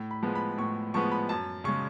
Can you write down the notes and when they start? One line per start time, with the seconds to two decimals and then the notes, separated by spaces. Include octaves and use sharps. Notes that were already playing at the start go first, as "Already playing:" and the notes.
Already playing: A2
0.11 B5
0.23 F3 G#3 B3
0.35 B5
0.58 A2 C#6
0.94 F3 G#3 B3 C#6
1.11 B5
1.29 F#2 A5
1.64 C#3 G#3 C#6